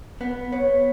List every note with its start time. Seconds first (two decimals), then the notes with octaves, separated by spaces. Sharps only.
0.21 B3
0.52 B3 C#5